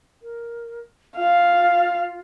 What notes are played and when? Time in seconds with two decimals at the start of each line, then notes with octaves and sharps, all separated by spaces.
0.22 A#4
1.17 F4 F5